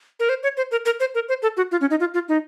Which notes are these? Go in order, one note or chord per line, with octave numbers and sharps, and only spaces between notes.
A#4
C5
C#5
C5
A#4
A#4
C5
A#4
C5
A4
F#4
F4
C#4
D#4
F4
F4
D#4